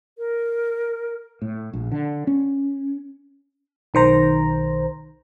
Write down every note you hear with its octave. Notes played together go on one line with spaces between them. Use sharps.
A#4
A2
A#1
D3
C#4
B1 D#3 C5 A#5